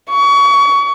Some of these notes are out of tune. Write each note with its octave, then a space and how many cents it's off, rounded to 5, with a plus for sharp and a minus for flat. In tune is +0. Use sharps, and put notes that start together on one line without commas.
C#6 +30